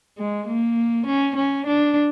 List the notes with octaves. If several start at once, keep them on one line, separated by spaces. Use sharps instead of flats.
G#3
A#3
C#4
C#4
D4